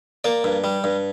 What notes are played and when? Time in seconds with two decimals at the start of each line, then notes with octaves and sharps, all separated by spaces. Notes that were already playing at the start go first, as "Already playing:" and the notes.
0.24 A#3 D5
0.44 G2
0.64 G3
0.84 G2